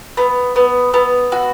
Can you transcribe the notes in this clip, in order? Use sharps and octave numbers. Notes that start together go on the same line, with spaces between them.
B3
B3
B3
F#4